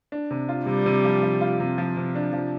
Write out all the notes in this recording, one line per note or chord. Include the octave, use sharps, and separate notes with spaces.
D4
C3
F4
C3 G3
C3
F3
F3
F4
C3
F3
C3
D4
F3